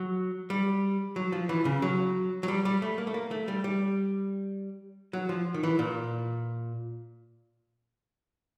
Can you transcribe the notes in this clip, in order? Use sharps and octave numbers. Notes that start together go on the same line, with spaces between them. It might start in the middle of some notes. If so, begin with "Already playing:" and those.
Already playing: F#3
G3
F#3
F3
E3
C#3
F#3
F#3
G3
G3
A3
A#3
A3
A#3
A3
G3
G3
F#3
F3
D#3
E3
A#2